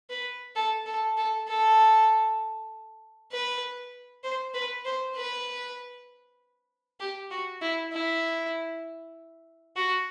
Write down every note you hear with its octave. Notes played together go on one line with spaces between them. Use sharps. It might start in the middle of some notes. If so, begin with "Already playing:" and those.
B4
A4
A4
A4
A4
B4
C5
B4
C5
B4
G4
F#4
E4
E4
F#4